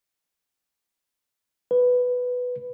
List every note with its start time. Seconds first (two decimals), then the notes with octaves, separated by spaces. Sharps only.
1.71 B4